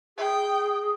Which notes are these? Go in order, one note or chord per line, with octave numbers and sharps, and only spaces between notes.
G#4 G5